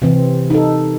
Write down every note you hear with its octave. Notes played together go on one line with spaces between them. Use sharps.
C3 E3 C4
D#4 A4